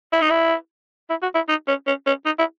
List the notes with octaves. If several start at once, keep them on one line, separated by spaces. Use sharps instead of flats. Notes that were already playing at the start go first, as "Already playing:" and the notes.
E4
D#4
E4
E4
F#4
E4
D#4
C#4
C#4
C#4
D#4
E4